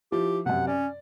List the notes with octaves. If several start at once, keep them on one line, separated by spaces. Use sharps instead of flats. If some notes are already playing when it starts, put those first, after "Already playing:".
F3 E4 G4
F#2 C3 F#5
C#4 D5